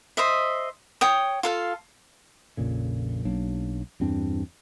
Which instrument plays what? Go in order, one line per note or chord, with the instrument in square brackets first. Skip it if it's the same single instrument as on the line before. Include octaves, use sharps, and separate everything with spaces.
[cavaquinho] C5 D#5 E5
C#5 G5 D#6
F4 A4 F5
[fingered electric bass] A#1 F2 A#2 C#3
B1 F#3 A#3 D4
E2 G2 C4 D4